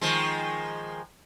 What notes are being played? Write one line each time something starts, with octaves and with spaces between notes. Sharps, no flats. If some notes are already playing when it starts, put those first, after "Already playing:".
D#3 F3 G#3